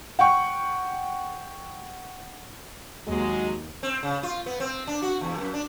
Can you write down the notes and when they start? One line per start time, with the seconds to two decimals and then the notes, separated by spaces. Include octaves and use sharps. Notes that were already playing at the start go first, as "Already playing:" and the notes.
0.19 F#5 G5 C#6
3.07 D#2 F#3 G#3
3.83 C4
4.03 C#3
4.23 F4
4.46 B3
4.60 C4
4.87 D4
5.02 F#4
5.21 E2
5.38 F#2
5.54 D4